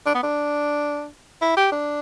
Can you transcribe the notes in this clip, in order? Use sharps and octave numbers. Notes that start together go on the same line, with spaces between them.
D4
B3
D4
E4
G4
D4